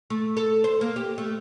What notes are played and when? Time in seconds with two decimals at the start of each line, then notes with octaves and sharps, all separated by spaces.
0.10 A3
0.37 A4
0.64 C5
0.81 A#3
0.96 G4
1.18 A3